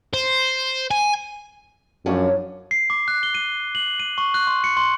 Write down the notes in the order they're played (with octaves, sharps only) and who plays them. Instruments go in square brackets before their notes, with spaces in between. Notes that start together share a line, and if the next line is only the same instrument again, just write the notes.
[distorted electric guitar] C5
G#5
[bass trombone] F#2 [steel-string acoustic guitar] F3 D4 C#5
[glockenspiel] C7
D6
F#6
G7
D#7
F#7
D#7
C#6
F#6
C6
C#7
C6